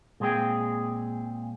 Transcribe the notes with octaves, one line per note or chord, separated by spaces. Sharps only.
A#2 G#3 C4 G#4 G5